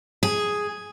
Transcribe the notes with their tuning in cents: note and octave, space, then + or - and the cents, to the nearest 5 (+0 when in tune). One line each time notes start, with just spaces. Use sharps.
G#4 +0